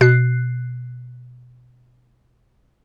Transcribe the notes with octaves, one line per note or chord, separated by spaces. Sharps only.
B2 F#6 C7